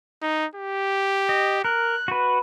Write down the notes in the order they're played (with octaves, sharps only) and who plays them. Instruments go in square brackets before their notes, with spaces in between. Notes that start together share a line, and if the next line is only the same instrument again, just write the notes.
[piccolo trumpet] D#4
G4
[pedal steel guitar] D#5
[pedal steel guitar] A#4 [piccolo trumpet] F#6
[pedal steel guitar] F#4 B4